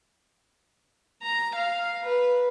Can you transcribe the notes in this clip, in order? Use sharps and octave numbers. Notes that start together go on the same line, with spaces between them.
A#5
F5
B4